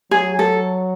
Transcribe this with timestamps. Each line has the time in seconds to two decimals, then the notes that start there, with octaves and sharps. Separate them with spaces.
0.11 F#3 G#4
0.39 A4